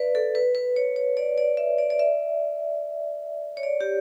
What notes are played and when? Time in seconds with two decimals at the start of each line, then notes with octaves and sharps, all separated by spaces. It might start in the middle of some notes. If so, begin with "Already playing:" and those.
Already playing: B4 D5 E5
0.15 A4
0.35 B4
0.55 B4
0.76 C#5
0.96 C#5
1.17 D5
1.38 D5
1.57 E5
1.78 D5
1.90 D5
1.99 E5
3.57 C#5
3.63 D5
3.81 G4